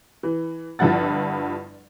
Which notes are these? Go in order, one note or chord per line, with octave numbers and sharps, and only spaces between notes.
E3
G1 G2 F3 E4 F#5 A6